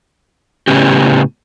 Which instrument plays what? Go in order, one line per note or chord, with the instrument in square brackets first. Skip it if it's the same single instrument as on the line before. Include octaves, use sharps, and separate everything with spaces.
[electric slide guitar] A2 C#3 B3 C#4 G4